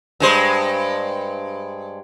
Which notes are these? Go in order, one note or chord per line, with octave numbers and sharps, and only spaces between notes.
G2 G#3 C5